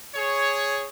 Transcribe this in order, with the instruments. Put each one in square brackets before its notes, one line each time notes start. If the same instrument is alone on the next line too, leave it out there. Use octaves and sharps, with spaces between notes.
[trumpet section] G#4 C#5